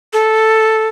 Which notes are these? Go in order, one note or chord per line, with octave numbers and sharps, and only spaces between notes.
A4